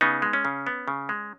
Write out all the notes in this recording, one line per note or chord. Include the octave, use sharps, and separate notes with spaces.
C#3 B3 D#4
G#3
C#4
C#3
B3
C#3
G#3